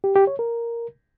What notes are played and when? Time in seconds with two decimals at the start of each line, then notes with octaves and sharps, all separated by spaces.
0.04 G4
0.16 G4
0.27 C#5
0.39 A#4